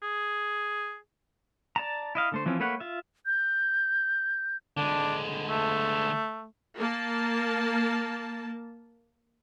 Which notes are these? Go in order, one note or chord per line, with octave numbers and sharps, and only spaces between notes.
G#4
D5 A5 A#5
E4 D#5 F5
D3 A3 C5
E3 F3 C4 C#4
A3 A#3 B4 C#5 F#5
F4 E5
G6
D3 G#3 D4
A3
A#3 A5